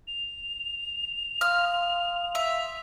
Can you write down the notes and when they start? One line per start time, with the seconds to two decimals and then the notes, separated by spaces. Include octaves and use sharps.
0.07 F7
1.41 F5 C6 D#6 F6
2.35 E5